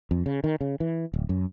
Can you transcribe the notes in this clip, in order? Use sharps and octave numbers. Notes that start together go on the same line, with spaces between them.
F2
C#3
D#3
C#3
E3
D1
F#2